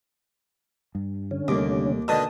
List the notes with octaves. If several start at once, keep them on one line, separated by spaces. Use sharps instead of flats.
G2
D3 C#4
D#2 C3 G3 A3 A#3 D6
B2 D3 D#3 A5 D#6